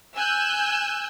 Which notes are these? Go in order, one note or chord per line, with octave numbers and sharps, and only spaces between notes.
G#5 E6 F#6 G6